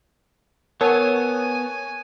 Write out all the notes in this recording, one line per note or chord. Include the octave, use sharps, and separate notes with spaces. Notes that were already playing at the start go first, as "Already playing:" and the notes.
B3 A#4 C#5 F#5 G#5 A5